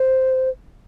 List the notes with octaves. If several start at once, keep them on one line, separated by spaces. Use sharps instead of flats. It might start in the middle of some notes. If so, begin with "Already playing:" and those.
Already playing: C5